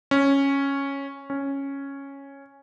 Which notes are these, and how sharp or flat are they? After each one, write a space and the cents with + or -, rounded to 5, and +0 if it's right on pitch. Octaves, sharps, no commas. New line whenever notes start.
C#4 -5
C#4 -5